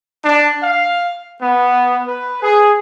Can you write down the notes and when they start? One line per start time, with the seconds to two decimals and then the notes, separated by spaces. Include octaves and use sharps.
0.25 D4
0.62 F5
1.42 B3
2.05 B4
2.43 G#4